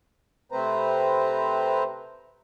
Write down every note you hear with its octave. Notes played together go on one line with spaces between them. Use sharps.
C3 A3 C4 B4 C5 A#5